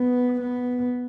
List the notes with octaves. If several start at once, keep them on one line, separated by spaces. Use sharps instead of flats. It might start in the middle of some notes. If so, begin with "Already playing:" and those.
Already playing: B3
B3